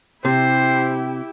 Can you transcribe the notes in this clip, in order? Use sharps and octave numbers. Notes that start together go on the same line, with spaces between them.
C3 E4 G4 C5 G5